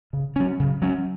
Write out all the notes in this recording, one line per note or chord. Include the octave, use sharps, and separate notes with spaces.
C#3
F#3 C#4
C#3
F#3 C#4